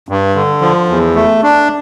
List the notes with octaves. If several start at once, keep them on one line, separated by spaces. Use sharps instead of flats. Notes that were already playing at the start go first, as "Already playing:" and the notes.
G2
D3
F3
E2
A3
D4